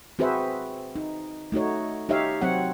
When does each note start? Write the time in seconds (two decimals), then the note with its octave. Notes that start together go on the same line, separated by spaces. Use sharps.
0.19 C4 F#4 G#4 B4 C5 E5
0.96 D#4
1.52 A3 D#4 F#4 C#5
2.09 D#4 G4 C#5 E5 F5
2.41 F#3 C4 C#5 F#5